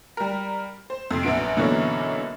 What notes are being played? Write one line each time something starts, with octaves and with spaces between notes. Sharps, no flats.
G3 A#4
C5
F2 C3
A#1 F#2 B3 D7
F#2 B2 D3 E3 A#3 C#4